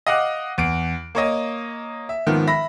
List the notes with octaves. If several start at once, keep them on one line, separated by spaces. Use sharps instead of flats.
D#5 F5 F#5 D6 F#6
E2 D7
A#3 C#5 D#5
E5
G#2 D#3 F3 B3
E5 B5 A#6